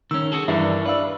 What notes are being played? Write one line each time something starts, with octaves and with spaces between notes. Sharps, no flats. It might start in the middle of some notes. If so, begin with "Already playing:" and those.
D#3 C#4 E6
F#4 G#4 A4
G2 E3 D4 A#4 E5
B4 D5 F5 E6